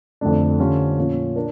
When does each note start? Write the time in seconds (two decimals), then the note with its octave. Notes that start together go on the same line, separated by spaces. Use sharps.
0.21 F2 D3 A3 D4
0.59 D3 G3 C#4 F4
0.97 A#2 F3 C#4
1.36 D4 A#4